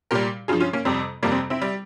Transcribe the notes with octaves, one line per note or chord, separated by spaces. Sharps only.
A#2 G3 G4 A#4
G2 F3 F4 G#4
C#4 F4
A#3 C#4
F2 C3 G3 C4
F2 C3 G3 A#3
C4
C4 E4
G3